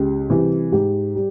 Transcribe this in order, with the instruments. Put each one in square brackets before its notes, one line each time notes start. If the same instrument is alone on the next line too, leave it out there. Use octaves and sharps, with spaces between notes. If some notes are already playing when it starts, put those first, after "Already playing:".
Already playing: [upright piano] C#2 G4
C3 E3 G3
G#2 G4
G3